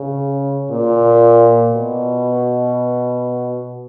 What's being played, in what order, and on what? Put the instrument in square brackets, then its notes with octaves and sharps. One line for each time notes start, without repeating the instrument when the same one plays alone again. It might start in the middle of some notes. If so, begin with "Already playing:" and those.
Already playing: [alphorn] C#3
A#2
B2